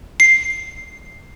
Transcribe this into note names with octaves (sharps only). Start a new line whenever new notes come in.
C7